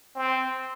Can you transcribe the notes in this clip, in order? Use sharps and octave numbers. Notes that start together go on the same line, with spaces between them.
C4